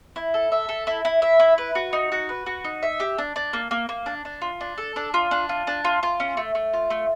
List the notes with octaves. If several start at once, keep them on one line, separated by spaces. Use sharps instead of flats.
E4
A4
E5
A4
E4
E4
E5
E4
B4
F#4
D#4
F#4
B4
F#4
D#4
E5
G4
D4
D4
A#3
A#3
A#3
D4
D4
F4
D4
A4
D4
F4
D4
F4
D4
F4
F4
C#4
A3
A3
F4
A3